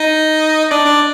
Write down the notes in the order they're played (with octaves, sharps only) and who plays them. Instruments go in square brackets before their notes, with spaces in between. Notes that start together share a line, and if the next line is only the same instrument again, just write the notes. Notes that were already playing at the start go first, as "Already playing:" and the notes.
Already playing: [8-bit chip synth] D#4 D#5
D4 D5
D4 D5